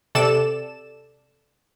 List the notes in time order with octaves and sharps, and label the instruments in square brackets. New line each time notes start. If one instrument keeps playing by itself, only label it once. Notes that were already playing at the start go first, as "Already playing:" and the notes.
[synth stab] C3 A4 D5 E7